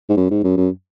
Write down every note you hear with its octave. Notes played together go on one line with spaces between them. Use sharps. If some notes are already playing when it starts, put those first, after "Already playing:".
G#2
F#2
G#2
F#2
F#2